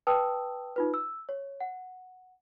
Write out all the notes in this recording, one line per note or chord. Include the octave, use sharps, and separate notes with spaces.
B4 G5 A5 D#6 E6
D#4 F4 B4
E6
C#5
F#5